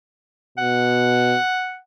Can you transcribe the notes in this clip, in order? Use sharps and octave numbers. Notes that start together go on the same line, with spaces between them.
B2 F#5